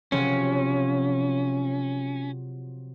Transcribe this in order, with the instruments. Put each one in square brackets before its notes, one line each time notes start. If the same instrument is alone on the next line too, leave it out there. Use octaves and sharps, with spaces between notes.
[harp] C3 F3 F#3 [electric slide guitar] C#4